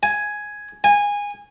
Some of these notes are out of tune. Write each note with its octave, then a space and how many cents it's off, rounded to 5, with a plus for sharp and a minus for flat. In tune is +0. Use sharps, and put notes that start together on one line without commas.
G#5 +5
G#5 -20